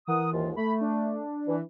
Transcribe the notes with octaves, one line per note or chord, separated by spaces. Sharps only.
E3 A#4 F#5 D#6
D#2 G#2 F4
A3 B5
D4
E3